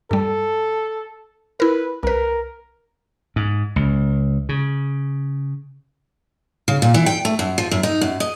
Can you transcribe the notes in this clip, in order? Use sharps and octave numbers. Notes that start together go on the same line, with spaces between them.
G2 G3 A4
E4 A#4 B4
C2 A#4 B4
G#2
C#2
C#3
C#3
A#2
E3
G5
A3
F#2
F3
F#2
D#4
F#2
D#5